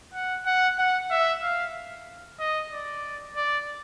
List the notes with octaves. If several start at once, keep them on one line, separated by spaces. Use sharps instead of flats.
F#5
F#5
F#5
E5
F5
D#5
D5
D5